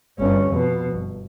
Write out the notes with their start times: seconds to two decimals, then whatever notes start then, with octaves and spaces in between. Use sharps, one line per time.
0.19 G1 C#4
0.48 F2 B2
0.92 G1